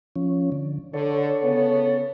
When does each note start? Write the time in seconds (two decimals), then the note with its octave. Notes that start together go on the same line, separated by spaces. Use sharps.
0.16 F3 C#4
0.52 D3
0.94 D3 A4 C#5
1.42 C#3 B3